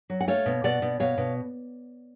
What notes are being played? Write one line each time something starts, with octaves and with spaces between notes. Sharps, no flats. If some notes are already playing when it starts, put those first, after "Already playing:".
F#3
F#5
A3 C#5 F5
B2
B2 D5 F#5
B2
B2 C#5 F5
B2